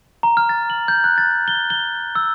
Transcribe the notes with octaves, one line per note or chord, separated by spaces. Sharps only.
A#5
F6
A6
F#7
G6
F#6
A6
G7
G7
E6